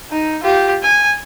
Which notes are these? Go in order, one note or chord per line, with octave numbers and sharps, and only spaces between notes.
D#4
F4 G4
G#5